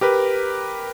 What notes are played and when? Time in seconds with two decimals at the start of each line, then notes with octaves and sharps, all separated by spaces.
0.01 G4 A#4 B4